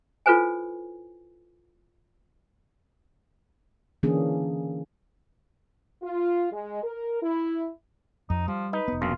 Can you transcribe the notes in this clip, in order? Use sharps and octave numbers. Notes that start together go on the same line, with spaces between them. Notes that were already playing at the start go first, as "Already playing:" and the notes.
E4 F4 A4 B4 C5 G#5
D3 E3 A#3 C#4 D4 G#4
F4
G#3
A#4
E4
F2 D#4
F3 G3
D#4 B4
E1 B3
A#1 F#2 F4